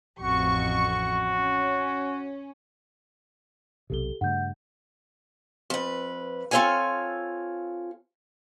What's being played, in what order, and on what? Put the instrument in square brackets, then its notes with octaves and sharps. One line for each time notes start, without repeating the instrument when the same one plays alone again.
[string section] A1 F2 C#6 [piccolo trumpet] F#4
[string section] C#4
[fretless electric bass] B1 C3 [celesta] G4 A4 G7
[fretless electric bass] G2 C#3 A3 [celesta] F#5 G6
[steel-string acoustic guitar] F2 B4
C4 F4 A4 C#5 F5 G#5